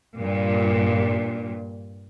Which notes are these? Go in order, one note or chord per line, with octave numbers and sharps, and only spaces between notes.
G2 A#2